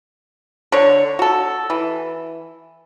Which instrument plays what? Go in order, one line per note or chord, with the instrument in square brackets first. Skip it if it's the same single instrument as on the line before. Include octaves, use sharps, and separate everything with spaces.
[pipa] D3 C#5
F#4 A4
E3